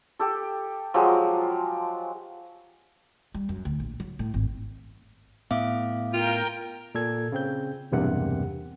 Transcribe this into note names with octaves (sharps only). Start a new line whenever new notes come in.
G4 A4
F3 F#3 G#3 G4
G3
F#2
D2
A#1
F#3
A2
G#1
A2 B3 E5 F5 D6
F4 A#4 G5
A#2 A4 G#6
C#3 C4 G6
B1 E2 G2 C3 A#3 F#5